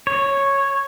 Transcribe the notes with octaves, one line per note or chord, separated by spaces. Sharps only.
C#5